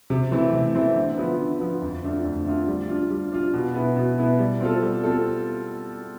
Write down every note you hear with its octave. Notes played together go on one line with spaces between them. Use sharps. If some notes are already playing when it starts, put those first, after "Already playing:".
C3
E3 A3 C4 E4
C3
E3 A3 C4 E4
D3
F3 B3
D3
F3 B3
F2
D3 A3 D4 F4
F2
D3 A3 D4 F4
G3
D4 F4
G3
D4 F4
B2
B3 E4
B2
B3 E4
G3
C4 F4 A4
G3
C4 F4 A4